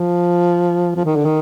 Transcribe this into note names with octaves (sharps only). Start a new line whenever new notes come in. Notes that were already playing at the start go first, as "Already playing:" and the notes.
Already playing: F3
F3
D#3
D3
D#3